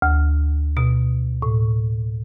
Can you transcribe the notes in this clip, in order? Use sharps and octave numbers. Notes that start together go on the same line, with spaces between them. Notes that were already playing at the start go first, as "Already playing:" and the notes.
D2
B2
A2